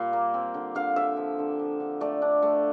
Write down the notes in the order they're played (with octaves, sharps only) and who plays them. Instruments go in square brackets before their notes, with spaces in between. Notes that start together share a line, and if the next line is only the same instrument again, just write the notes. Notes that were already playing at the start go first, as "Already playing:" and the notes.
Already playing: [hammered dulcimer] A#2 G3 [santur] F5
[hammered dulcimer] A#3
C4
D3
[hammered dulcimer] D3 [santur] F5
[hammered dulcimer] D3 [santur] E5
[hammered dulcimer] F3
D3
F3
D3
[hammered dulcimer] A3 [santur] D5
[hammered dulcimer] D4
A3